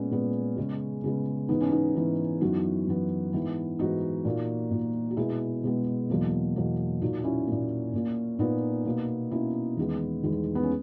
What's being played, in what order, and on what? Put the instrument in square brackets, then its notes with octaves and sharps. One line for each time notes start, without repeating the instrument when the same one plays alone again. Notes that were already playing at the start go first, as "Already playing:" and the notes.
Already playing: [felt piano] A#2 G#3 B3 C#4
A#2 G#3 B3
C#3 G#3 B3
C#3 G#3 B3
G#2 E3 B3 D#4
C#4
B3 D#4
G#2 E3 B3
F#2 E3 B3 D#4 F#4
F#2 E3 B3
G#2 E3 B3
G#2 E3 B3 D#4 F#4
A#2 A#3
A#2 A#3
F#4
B2 G#3 B3 E4 G#4
B2 G#3 B3
E2 B2 F#3 A#3
E2 B2 F#3 A#3
A#2 A#3 D#4 F#4
C#4 E4
A#2 A#3
A#2 A#3
A#2 A#3 B3 D#4
B2 A#3
B2 A#3 C#4 E4
E2 D#3 G#3 B3
E2 D#3 G#3 B3
B3
C#4